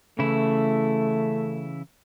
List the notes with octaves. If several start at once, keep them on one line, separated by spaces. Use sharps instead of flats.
C#3 E3 A3 E4